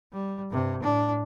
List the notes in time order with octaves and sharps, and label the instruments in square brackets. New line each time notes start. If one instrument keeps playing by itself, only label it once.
[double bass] G3
G2 C3
A2 D4